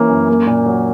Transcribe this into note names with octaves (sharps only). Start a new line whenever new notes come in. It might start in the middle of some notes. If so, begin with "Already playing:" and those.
Already playing: E3 A#3 C#4
F#2
A#3
A#2
F#3